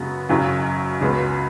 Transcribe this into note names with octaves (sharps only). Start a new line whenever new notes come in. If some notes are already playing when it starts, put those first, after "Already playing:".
Already playing: F#2 C#3 G#3 B3 F#4
G#1 F#2 C#3 F#3
C#2 C#3 G#3 B3 F#4